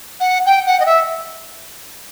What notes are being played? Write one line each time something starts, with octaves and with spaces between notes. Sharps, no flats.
F#5
G5
F#5
D#5
E5